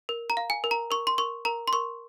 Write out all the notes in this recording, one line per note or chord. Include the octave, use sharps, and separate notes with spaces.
A#4
A#5
F5
G#5
A#4
A#5
A#4 C#6
C6
A#4 C#6
A#4 A#5
C6
A#4 C#6